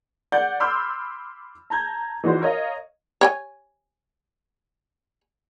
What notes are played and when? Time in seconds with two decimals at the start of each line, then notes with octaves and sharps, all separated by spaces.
0.32 D5 F#5 G6 A6
0.60 B5 C6 D6 E6 F6 G6
1.70 A5 A#5 G6 G#6
2.24 E3 D#4 F4 F#4 C5
2.41 A#4 C#5 D#5 F5
3.21 C#5 G5 G#5